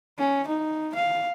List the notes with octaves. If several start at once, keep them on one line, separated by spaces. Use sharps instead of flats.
C#4
D#4
F5